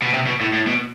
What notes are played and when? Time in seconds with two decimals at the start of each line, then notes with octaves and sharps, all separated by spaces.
0.02 B2
0.14 C3
0.26 B2
0.41 A2
0.53 A2
0.67 B2